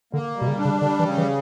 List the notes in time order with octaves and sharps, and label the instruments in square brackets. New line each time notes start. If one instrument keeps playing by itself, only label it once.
[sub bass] D3 [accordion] A#3
[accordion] G3
[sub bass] B2
C#3
[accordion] D4
[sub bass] C#3
[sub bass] D3 [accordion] G3
[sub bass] E3
[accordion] C#3
[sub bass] E3